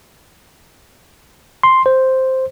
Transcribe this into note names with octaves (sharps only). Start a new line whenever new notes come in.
C6
C5